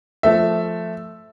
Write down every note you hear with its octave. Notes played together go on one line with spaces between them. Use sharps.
F3 A3 E5